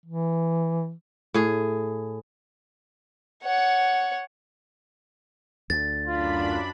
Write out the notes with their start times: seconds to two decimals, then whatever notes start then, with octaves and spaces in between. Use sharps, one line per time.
0.05 E3
1.34 A2 G#4
3.44 C#5 F#5
5.70 D2 A6
6.07 F#2 D4 F4 B5